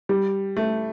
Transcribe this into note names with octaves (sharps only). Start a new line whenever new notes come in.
G3
A3